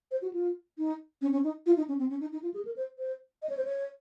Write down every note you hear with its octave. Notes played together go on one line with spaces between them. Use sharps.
C5
F#4
F4
D#4
C#4
C#4
D#4
F4
D#4
C#4
C4
C#4
D#4
D#4
F4
G#4
A#4
C5
C5
D#5
C#5
C5
C#5